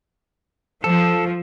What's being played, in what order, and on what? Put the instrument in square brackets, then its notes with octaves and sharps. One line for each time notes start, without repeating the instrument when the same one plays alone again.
[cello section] F3 [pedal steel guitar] A4